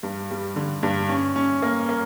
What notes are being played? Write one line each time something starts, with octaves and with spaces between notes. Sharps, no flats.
G2
G3
D3
G2
C#4
C#4
A#3
A#3